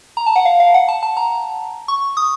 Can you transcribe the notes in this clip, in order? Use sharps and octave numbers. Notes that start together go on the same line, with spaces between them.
A#5
A5
F#5
F5
F5
F#5
A5
A5
A#5
C#6
D#6